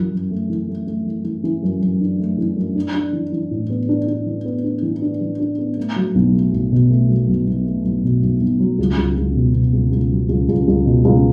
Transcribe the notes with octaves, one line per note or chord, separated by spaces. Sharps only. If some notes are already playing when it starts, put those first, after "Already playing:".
Already playing: F#2 E3
F#2
A3
E3
A3
A3
E3
E3
E3
F#2
F#2
D4
A3
E3
F#2
D4
D4
E3
E3
A2
B3
D4
D4
E3
B3
D4
E3
D4
E3
D4
B3
A3
F#3
B1
A3
B1
B2
A3
F#3
B1
B1
A3
B1
B2
B1
B1
F#3
C#2
C#2
C#2
B2
B2
C#2
C#2
F#3
C#2
C#2
C#2
B2
C#2